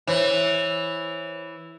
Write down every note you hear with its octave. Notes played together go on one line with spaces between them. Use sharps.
E3 C5 C#5